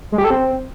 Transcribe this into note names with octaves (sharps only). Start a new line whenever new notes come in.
G#3
G4
A4
C4